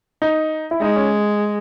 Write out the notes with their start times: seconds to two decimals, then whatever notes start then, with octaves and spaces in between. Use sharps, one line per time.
0.22 D#4
0.71 E4
0.81 G#3 D#4
0.96 C#4